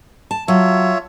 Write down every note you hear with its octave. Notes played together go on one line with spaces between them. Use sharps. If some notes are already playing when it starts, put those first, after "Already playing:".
A5
F#3 F4 C#5 E5